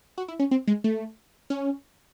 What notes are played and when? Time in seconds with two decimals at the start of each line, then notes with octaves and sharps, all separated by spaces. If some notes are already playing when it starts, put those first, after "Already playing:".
0.18 F#4
0.28 E4
0.39 C#4
0.51 C4
0.68 G#3
0.84 A3
1.50 C#4